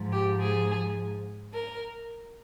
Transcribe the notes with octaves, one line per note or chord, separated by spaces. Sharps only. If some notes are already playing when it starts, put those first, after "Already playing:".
Already playing: G#2 F3
G4
G#4
A#4